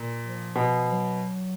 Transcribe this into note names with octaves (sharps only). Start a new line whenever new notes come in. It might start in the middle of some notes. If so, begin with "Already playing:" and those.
Already playing: A#2
F3
B2
F#3